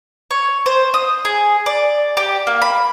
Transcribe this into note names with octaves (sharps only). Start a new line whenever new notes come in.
C#5
C5
D#6
G#4
D5
G4
A#3
B5